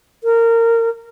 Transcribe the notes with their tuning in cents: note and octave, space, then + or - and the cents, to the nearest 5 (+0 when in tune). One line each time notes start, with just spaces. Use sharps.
A#4 -20